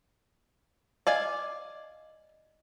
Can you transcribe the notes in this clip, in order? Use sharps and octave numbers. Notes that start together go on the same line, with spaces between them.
D5 D#5 F5 G#5